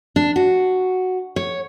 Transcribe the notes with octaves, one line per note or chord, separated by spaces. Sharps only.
D4
F#4
C#5